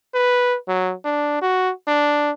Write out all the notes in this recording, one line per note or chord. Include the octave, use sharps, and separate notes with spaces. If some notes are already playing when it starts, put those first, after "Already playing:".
B4
F#3
D4
F#4
D4